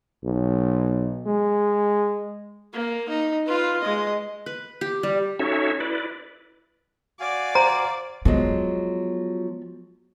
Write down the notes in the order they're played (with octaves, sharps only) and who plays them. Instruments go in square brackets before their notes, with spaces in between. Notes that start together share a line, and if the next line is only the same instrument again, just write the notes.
[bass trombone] B1
G#3
[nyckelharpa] A#3
D#4
F4 B4
G#3 D#5
[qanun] B4
G4
G3
[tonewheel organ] C#4 D#4 F#4 A4 C#5 E5
E4 B4 D5
[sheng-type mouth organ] F#4 F5 G#5 [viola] D5
[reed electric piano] C5 [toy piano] A#5
[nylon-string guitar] F3 F#3 G#3 [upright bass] B3